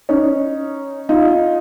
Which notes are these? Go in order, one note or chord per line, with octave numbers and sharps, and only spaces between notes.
C#4 D#4
D#4 F4